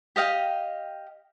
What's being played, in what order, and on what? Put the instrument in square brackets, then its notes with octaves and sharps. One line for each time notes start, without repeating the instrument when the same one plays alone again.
[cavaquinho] G4 D#5 F5 G5